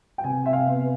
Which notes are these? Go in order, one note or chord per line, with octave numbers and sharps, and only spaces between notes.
G5
C3 G#5
E5
F5
B3